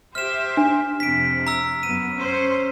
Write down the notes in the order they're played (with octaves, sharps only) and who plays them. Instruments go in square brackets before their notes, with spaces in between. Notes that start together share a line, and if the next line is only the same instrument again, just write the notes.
[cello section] G4 C5 E5 [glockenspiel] F6 E7
[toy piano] D4
[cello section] F2 C3 [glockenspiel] B6 D7
[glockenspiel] A#5 E6
[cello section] F#2 B3 [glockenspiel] D#7
[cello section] C#4 C5